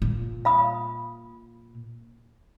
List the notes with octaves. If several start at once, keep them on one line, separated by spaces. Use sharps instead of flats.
A#2
F5 B5 D#6